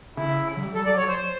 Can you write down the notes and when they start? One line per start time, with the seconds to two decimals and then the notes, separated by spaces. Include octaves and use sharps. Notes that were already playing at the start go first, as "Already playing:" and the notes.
0.16 C#3 E4
0.57 F#3
0.63 G3
0.74 A4
0.85 F#3 D5
0.97 C#5
1.08 C5